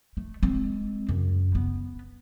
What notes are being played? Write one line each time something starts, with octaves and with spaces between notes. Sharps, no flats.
A3
G#3 C4
F#2 C#3
B3